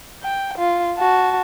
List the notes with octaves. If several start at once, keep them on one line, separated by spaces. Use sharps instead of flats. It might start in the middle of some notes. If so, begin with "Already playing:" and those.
G5
F4
F#4 A5